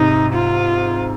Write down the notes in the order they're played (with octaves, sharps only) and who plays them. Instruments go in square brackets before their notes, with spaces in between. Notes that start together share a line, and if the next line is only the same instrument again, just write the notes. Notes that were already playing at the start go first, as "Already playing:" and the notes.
Already playing: [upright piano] G#2 C3 [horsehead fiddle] D#4
[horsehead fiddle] F4